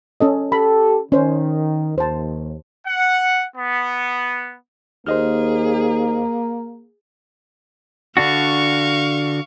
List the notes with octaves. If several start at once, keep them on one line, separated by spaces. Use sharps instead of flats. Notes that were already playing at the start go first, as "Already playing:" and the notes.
C#4 A4 D#5
G4 A4 B5
D#3 C#4 C5
D#2 C5 A5
F#5
B3
D#2 A#3 G#4 C5 D#5 F6
D3 D4 F#4 F5 C#6